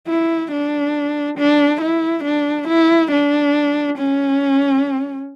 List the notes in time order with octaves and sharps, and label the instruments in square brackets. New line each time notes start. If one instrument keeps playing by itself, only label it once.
[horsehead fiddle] E4
D4
D4
E4
D4
E4
D4
C#4